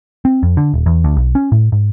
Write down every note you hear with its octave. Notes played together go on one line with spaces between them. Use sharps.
C4
F2
D3
D#1
E2
D2
B1
C#4
A2
G#2